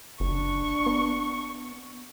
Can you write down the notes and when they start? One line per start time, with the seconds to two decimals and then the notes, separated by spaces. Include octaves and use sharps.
0.20 F#1 D4 C#6
0.86 B3